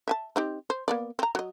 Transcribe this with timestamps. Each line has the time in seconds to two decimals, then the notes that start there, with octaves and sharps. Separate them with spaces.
0.08 E5 G#5 A5
0.36 C4 D#4 G4
0.70 C5
0.88 A#3 B3 D5
1.19 C4 A#5
1.35 F#3 D#5